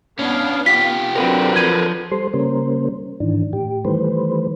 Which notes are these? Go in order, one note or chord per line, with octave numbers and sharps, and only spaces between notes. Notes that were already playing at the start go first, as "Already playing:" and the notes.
B3 C#4 D4 F5
F4 G4 B6
D3 F#3 C4 A#4 B4
F3 G#6 D#7
G3 A4 C5 C6
C#3 G3 A#3 C#4 A#4 C5
G#2 D#3 E3 D4
A2 G4
D#3 E3 G3 A3 B4 C5